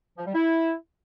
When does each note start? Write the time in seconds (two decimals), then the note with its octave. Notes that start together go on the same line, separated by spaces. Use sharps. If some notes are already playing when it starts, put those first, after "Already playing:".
0.18 F3
0.26 G3
0.34 E4